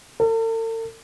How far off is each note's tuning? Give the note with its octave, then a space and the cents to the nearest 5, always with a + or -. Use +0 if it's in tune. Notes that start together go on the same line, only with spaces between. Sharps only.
A4 +45